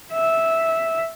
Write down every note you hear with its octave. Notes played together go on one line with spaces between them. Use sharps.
E5